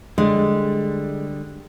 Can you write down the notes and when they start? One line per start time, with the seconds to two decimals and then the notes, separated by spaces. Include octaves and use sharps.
0.18 D3 G3 G#3